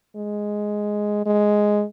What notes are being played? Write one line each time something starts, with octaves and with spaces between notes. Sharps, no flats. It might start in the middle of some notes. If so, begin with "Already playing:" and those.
G#3
G#3